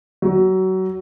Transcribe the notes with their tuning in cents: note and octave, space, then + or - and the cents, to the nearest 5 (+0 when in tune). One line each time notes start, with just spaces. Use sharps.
F#3 +25